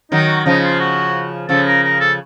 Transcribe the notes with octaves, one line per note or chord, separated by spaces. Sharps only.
D#3 F#3 D#4
F#4
C#3 F3 D#4
F4
F#4
C#3 F3 A4
A#4
A#4
A4